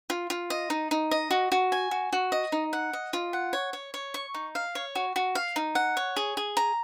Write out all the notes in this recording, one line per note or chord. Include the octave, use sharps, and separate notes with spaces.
F4
F4
D#5
D#4
D#4
D#5
F#4
F#4
G#5
F#4
F#4
D#5
D#4
F#5
D#5
F4
F#5
C#5
C#5
C#5
C#6
D#4
F5
C#5
F#4
F#4
F5
D#4
F#5
C#5
G#4
G#4
A#5